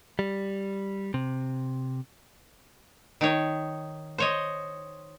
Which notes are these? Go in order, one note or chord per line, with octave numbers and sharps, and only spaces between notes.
G3
C3
D#3 D#4 C#5
C5 C#5 D#5